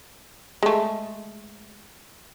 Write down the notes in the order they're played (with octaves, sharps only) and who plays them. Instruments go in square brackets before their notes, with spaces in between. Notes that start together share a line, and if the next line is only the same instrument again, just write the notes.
[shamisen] G#3 A3